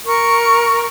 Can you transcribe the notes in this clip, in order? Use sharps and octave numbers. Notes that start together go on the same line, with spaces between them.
A#4 C#6